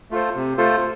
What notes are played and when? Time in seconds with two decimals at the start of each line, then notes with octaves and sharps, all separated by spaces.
0.11 A3 F4 A4 C5
0.35 C3
0.58 A3 F4 A4 C5